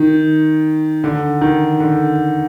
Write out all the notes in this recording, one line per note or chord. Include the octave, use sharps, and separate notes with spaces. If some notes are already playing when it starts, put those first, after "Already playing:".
Already playing: D#3
D3
D#3
D3